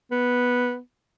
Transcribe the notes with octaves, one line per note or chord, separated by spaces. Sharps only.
B3